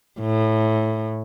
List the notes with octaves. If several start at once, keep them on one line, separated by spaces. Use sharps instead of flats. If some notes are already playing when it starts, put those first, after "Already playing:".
A2